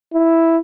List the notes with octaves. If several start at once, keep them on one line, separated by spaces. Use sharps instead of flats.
E4